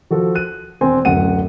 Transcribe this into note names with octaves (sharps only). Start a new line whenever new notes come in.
F3 F#4 A4
F#6 D#7
E1 C4 G#5
D1 F#2 F#5 D#7